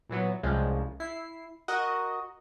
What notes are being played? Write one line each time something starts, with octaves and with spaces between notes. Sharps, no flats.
A#2 E3 F#3 B3
C2 C#3 F3 G#3
E4 C7
F#4 A#4 D#5